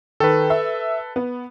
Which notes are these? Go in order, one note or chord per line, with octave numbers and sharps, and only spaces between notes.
D#3 A4 B4
E5
B3